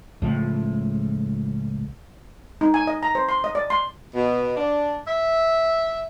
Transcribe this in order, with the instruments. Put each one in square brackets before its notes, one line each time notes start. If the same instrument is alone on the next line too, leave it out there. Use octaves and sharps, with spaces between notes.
[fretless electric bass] C#2 A2 F3
[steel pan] D#4
G#5
D#5
A#5
C5
C6
D#5
D5
C6
[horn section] B2
D4
E5